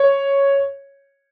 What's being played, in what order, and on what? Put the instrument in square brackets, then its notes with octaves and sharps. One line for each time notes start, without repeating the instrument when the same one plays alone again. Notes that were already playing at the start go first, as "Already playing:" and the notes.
Already playing: [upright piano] C#5